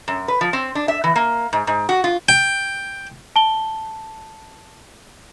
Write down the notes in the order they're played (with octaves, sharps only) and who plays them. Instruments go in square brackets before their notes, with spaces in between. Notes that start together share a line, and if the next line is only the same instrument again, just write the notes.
[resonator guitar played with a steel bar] F#2
B4
F3
C4
D4
E5
E3
A#3
G#2
G#2
F#4
F4
[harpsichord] G5
[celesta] A5 G7